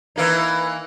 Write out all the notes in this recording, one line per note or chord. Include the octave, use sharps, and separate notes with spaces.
E3 A#3 D#4